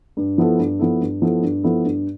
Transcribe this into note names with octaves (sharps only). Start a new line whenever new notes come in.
G2
F3 B3 E4 A4
G2
F3 B3 E4 A4
G2
F3 B3 E4 A4
G2
F3 B3 E4 A4
G2